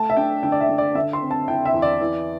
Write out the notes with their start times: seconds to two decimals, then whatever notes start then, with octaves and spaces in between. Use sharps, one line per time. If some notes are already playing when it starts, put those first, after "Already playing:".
Already playing: A3 A5
0.10 E5
0.17 D4 G5
0.43 D3 G5
0.52 D5
0.61 E5
0.69 D3
0.78 D5
0.95 D3 E5
1.13 C6
1.22 C4
1.31 A5
1.48 E4 G5
1.66 E5
1.74 E2
1.82 D5
2.01 E3